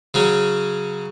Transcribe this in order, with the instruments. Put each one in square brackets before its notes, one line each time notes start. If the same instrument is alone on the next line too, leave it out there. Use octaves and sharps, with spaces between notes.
[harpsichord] C#3 F#3 C#4